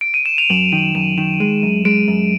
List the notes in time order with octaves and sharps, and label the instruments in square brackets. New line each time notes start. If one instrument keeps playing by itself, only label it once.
[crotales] D7
D#7
E7
F7
[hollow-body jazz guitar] F#2 [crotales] F#7
[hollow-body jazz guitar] D#3 [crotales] F7
[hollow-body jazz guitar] F#2 [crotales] E7
[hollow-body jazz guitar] D#3 [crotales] F7
[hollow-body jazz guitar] G#3 [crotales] D#7
[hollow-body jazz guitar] F#2
[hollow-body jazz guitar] G#3 [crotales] D7
[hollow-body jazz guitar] F#2